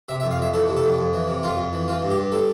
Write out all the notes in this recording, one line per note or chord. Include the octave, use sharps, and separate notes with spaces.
C3 E5
E5
F2
F5
F2 E5
E3 A4
C3
A4
F2
F2
E3
C3
F2 F4
F2
E3
E3 F4
G2
G4
G2
G3 A4